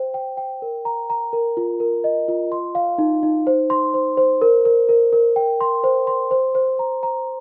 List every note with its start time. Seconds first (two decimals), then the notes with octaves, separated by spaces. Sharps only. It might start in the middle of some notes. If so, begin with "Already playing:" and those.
Already playing: C5 G5
0.14 G5
0.37 G5
0.62 A#4
0.85 A#5
1.10 A#5
1.33 A#4
1.57 F4
1.80 A#4
2.04 D#5
2.28 F4
2.52 C6
2.75 F5
2.98 D#4
3.23 D#4
3.47 C5
3.70 C6
3.94 C5
4.17 C5
4.42 A#4
4.65 A#4
4.89 A#4
5.13 A#4
5.36 G5
5.61 C6
5.84 C5
6.07 C6
6.31 C5
6.55 C5
6.79 A#5
7.03 A#5